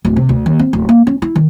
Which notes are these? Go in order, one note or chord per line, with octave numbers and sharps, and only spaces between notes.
D1
C3
D2
D#2
C4
D1
A#3
C#4
E4
D#3